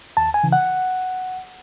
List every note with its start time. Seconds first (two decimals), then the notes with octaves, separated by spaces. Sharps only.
0.17 D#2 A5
0.34 G#5
0.43 C#3 E3
0.53 F#5